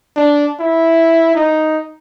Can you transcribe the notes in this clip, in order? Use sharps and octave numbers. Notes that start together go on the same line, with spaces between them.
D4
E4
D#4